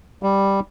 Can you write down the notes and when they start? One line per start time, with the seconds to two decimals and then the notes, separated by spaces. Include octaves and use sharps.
0.23 G3